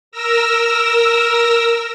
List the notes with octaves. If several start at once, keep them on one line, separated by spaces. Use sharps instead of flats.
A#4 E6 A#6